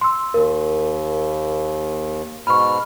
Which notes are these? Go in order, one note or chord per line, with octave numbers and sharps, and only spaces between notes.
C6 E6
D#2 A#4
G#2 B2 B5 C#6 F6